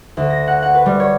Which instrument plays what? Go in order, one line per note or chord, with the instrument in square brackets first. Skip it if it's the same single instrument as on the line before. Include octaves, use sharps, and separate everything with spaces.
[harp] D2
A#6
F#5
F#5
B4
G3
C#5